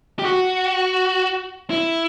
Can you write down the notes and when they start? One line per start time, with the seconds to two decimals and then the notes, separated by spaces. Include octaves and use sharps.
0.19 G4
0.25 F#4
1.70 E4